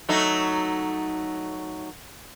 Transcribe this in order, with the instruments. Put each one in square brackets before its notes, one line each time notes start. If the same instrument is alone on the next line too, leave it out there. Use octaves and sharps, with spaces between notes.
[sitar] F#3 A3 D#4